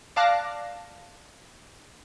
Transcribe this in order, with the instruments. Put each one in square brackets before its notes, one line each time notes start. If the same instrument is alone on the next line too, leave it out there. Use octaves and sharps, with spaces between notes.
[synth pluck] D5 F5 A5 D6 F#6 A#6